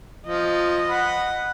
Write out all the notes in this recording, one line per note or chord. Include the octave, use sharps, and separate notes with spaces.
F3 D#5
F#5 B5